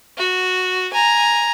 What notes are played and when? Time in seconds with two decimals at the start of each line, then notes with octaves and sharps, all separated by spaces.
0.18 F#4
0.93 G#5 A#5